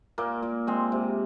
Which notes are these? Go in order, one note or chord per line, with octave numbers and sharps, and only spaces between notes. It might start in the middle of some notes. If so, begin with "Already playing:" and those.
A#2 A#3
A#2
G#3 C4
C3